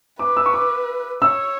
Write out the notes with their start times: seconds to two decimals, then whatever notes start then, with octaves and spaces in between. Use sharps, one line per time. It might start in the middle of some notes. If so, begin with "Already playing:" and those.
0.19 B4 D6
0.37 E6
0.46 C#6
0.53 D6
1.22 C#5 E6